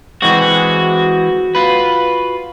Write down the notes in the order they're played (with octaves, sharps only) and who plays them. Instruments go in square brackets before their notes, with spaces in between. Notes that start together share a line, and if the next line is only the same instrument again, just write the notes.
[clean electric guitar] E3 G#3 C4 [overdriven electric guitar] F#4
[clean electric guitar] F4 B4